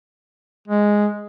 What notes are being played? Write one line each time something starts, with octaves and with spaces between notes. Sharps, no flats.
G#3